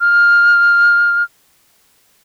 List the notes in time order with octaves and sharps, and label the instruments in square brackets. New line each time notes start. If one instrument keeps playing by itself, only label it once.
[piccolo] F6